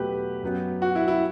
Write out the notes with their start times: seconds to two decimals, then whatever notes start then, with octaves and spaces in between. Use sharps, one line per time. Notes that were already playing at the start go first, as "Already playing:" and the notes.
Already playing: E2 B2 F#3 A3 G4 B4
0.43 F#2 F#3 B3
0.82 F#4
0.95 E4
1.08 E4